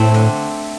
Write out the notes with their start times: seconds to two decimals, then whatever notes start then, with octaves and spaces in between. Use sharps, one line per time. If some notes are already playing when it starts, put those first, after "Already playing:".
Already playing: A2 A3 C4
0.14 D3